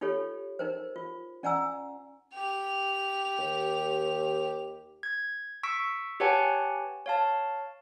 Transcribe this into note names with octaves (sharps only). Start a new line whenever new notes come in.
D#4 F4 G4 A4 C#5
D#4 A#4 C5
F4
C#4 D5 F#5 G#5 A#5 E6
G4 F7
D#2
G#6
C#6 E6 B6 D7
G4 B4 C#5 F#5 G#5 A5
C#5 F5 A5